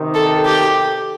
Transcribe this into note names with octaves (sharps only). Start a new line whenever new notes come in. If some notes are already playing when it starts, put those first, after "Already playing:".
Already playing: C3 D#3
A4
G4